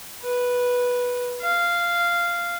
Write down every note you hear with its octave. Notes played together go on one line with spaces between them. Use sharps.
B4
F5